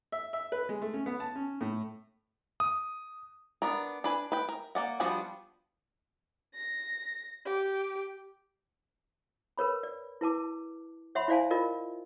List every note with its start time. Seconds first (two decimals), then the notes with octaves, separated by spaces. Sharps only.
0.12 E5
0.33 E5
0.52 B4
0.69 G#3
0.82 A3
0.94 C#4
1.06 B3
1.20 A5
1.35 C#4
1.61 A2
2.60 D#6
3.62 B3 D4 A#4
4.04 D4 B4 G#5
4.32 B4 G5
4.49 A#4
4.75 A#3 D5 F#5
5.00 F3 G3 B3 D4 F#4
6.55 A#6
7.45 G4
9.58 A#4 B4 C#5 B5
9.83 D5
10.21 E4 B4 A5 D6
11.15 C#5 E5 F#5 B5 C6
11.28 E4 C5 D5 F5 G#5 A5
11.51 F4 A#4 D5 D#5